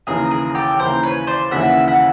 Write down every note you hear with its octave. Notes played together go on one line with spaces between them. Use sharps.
D#2 C#3 E3 G#4 A#4
G#4 A#4
G4 A4
D#2 C#3 E3 A#4 C5
B4 C#5
C5 D5
D#2 C#3 E3 E5 F#5
E5 F#5